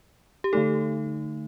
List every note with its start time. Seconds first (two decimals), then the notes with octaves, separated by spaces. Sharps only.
0.44 G4
0.53 D3 A3 D#4 A4